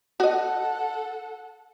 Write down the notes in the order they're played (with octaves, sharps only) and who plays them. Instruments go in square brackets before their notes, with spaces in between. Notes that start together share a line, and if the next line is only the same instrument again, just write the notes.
[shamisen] F#4 D#5 [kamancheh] A4 F#5